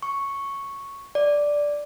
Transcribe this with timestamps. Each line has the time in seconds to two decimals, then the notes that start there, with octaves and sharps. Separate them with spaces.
0.03 C#6
1.15 D5